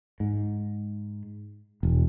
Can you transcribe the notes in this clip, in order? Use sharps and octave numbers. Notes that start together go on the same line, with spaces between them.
G#2
E1